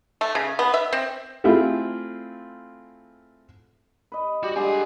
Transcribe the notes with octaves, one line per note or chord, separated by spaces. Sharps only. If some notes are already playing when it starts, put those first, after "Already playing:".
A3
C#3
B3
E5
C4
A3 C4 E4 F4 G#4
B4 D#5
G3 F#4 G4
G#3 D4 A4 F#5 G#5